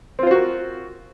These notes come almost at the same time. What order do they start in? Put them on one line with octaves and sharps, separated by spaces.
C4 F4 C5 F#4 A#4